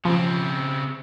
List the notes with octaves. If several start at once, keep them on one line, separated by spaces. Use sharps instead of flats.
C#3 F3 C4